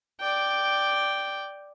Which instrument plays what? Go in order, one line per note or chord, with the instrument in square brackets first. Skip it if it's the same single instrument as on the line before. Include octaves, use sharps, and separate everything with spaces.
[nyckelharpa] D5 G5